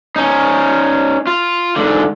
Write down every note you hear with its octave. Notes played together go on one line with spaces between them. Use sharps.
C#4 D#4
F4
G#2 D3